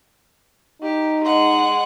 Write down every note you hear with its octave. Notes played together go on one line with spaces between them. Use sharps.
D#4 G4
G#3 F#5